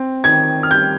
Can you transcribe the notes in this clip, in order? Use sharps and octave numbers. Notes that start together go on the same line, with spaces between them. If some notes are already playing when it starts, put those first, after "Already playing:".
Already playing: C4
D#3 G#6
F6
G3 G6